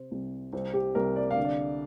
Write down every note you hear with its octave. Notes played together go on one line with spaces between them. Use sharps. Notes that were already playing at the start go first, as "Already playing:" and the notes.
Already playing: C3 C5
C2
C2 C4
G4
C2 A#4
D5
F5
D3
D5